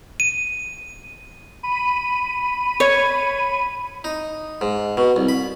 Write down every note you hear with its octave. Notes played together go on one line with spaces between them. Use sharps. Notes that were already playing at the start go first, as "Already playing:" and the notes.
D#7
B5 D#7
C#5
D#4
G#2
B2
C2
B5